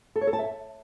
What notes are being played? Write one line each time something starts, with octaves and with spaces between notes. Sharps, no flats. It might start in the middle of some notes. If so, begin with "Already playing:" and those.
A4
C#5
A4
A5
E5